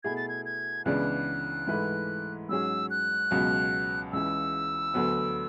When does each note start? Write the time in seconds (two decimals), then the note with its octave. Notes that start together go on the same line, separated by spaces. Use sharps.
0.04 B2 A3 E4 G#4 G#6
0.17 A6
0.29 G#6
0.45 G#6
0.85 C#2 C#3 E3 B3 D4 F#6
1.67 G#2 E3 A3 E4 B4
2.49 G#2 F#3 C#4 G#4 E6
2.90 F#6
3.31 C#2 B2 F#3
4.13 C#2 C#3 E3 E6
4.94 D2 D3 F#3 B3